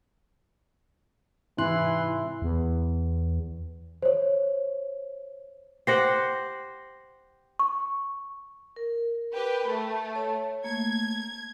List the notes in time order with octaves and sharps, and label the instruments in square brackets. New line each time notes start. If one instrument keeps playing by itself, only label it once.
[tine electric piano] G#2 C3 F#6 [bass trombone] E3 [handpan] E4 [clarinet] C6
[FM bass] E2
[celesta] C5 C#5
[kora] G4 C5 F#5 [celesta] A#6 C7
[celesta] C#6
[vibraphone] A#4
[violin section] G4 B4
A3
[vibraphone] C#5 A5
[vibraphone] A3 A#3 [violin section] G#6